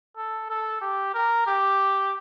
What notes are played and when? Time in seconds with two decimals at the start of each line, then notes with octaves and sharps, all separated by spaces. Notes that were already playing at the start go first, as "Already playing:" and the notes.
0.17 A4
0.50 A4
0.81 G4
1.14 A#4
1.47 G4